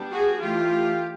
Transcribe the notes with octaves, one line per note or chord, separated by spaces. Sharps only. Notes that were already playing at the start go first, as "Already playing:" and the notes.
Already playing: G3 B3 D4
F#4 G#4
E3 A3 D4 F4 G4